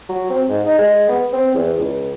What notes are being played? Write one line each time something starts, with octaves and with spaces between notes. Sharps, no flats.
F#3
C4
G#2
D#4
G#3
B3
C4
E2
C#2